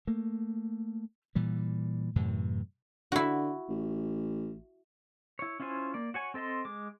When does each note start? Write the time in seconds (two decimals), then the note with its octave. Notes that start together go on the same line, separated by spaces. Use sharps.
0.07 A3 A#3
1.35 A#2 E3 G3
2.16 F#2 A2 C3 E3
3.12 D3 E4 F#4
3.69 A1
5.39 E4 C#5
5.60 C#4 E4 F4 C5 G#5
5.94 A#3 D5
6.14 F#4 C#5 G#5
6.34 C4 A4 D#5 A5 C6
6.65 G#3 D6